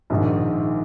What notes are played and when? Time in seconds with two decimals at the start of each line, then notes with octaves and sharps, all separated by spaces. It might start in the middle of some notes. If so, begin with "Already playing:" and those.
0.10 A#1 G#2 D#3